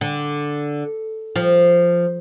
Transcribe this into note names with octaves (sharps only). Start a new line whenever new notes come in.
D3
F3